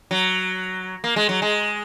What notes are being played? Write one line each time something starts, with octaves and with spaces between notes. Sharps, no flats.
F#3
A#3
G#3
F#3
G#3